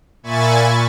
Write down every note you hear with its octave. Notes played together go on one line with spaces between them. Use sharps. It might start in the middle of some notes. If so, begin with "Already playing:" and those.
A#2 E5 G#5 B5 C#6 A6